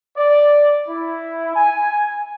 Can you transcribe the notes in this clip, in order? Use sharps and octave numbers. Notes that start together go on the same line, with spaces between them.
D5
E4
G#5